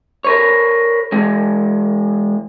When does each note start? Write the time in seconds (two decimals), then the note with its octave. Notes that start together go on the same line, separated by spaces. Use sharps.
0.25 A#4 B4 C#5
1.12 E3 G#3